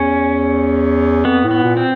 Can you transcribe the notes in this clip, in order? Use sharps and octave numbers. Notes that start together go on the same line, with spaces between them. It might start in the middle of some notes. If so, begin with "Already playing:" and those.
Already playing: E2 C#4
F2 B3
A2
B3
A#2
C4